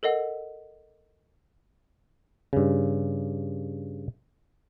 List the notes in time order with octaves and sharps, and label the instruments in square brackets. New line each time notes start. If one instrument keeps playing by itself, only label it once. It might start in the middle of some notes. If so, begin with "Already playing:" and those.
[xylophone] A4 A#4 D#5 F#5
[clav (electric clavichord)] G2 C#3